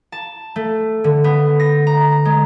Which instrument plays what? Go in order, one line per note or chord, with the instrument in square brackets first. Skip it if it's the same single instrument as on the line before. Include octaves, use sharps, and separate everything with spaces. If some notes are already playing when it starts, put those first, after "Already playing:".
[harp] A5
A3
D3
B3
A#6
A#5
G#3